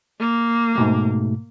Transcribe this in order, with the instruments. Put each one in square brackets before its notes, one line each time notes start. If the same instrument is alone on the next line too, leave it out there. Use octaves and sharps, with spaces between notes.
[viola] A#3
[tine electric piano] G#2 B2 A3